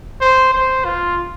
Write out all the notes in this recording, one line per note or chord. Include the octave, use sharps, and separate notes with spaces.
C5
C5
F4